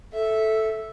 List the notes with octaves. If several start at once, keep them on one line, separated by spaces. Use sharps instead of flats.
A4 E5